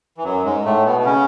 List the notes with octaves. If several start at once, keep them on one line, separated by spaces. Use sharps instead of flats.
E3
F#2 F#3
G#2 G#3
A2 A3
B2 B3
B3
C#3 C#4